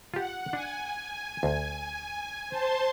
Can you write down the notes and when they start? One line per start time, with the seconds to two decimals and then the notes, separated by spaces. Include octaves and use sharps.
0.14 F4 G4 F#5
0.53 D4 G#5
1.43 D2
2.49 C5 A5 C6